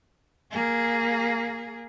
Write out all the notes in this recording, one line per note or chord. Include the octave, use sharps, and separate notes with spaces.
A#3 G#4